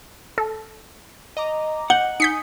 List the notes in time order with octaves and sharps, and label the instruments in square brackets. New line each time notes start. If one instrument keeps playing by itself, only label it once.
[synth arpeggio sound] A4
[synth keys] D#5 A#5 D6
[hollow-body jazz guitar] F#5 [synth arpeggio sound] G6
[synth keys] D#4 G#5 D#6 [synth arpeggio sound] G6 B6 C#7